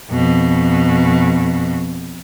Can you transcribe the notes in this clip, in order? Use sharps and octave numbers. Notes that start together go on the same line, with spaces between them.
F2 B2